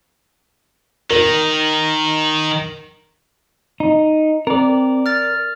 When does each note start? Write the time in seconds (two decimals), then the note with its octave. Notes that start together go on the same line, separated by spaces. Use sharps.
1.10 D#3 A#4
3.80 D#4
4.47 C4 A#4 D5
5.06 F6 A6